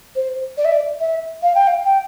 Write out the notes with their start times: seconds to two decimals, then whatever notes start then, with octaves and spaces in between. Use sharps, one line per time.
0.16 C5
0.58 D5
0.65 E5
0.72 D5
1.00 E5
1.42 F5
1.55 G5
1.67 F5
1.84 G5